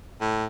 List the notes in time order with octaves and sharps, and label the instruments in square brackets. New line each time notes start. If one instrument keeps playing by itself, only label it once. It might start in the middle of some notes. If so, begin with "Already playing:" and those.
[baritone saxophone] A2